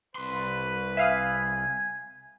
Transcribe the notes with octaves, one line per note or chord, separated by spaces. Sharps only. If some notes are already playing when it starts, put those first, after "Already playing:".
C2 B4 C6
E5 F5 G#5 D#6